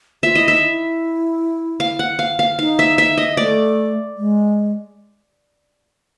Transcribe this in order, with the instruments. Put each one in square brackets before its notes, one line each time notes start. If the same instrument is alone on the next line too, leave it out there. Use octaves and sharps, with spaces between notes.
[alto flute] F4 [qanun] E5
[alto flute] E4 [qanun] D#5
[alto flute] D#4 [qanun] E5
[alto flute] E4
[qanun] F5
F#5
F5
F5
[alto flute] D#4 [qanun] F5
[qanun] E5
E5
D#5
[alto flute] A3 [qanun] D5
[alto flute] G#3